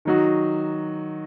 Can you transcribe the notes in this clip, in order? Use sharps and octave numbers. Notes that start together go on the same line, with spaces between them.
D#3 F#3 D#4 F#4